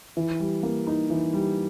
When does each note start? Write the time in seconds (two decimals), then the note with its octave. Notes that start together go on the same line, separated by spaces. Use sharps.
0.17 E3
0.40 G3
0.63 A#3
0.87 D#4
1.10 E3
1.34 G3